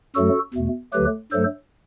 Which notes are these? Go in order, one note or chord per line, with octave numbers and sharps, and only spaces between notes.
F#2 F#3 A3 F#4 A4
E2 B2 A3
D2 D3 F#3 A3 G4 B4
G2 F#3 A3 A4 C5